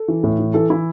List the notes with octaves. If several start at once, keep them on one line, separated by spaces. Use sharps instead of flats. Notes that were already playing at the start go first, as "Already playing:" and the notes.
Already playing: A4
E3
A2
E3
E3 A4
E3 E4